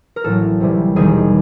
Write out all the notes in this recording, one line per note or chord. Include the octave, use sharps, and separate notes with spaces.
A#4
A1 A2 F#3 A4
C2 C3 E3 G3
E1 D#2 D#3 G3 G#4